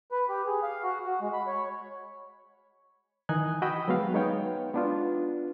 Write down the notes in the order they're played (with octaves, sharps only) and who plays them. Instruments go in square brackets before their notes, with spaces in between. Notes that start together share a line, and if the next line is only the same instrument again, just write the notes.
[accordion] B4
G4
G#4
F5
F#4
F#4
G#3
B5
C#5
[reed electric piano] D#3 E3 D#4 D#5 G#5 F#6
F#4 D#5 F#5 G5 B5 E6
F#3 G#3 B3 F#4 F5
G#3 B3 D#4 C#5 F5 G5
B3 D4 F4